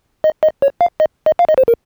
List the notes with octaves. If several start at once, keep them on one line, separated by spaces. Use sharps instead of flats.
D#5
D#5
C#5
F5
D#5
D#5
F5
D#5
C5
A#4